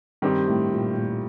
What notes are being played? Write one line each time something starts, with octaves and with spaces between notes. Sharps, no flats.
G2 D#3 G3 C4 G4
A2
A#2
A#2
A2